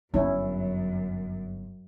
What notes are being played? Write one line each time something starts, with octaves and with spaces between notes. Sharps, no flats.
G1 F#2 C#4 E4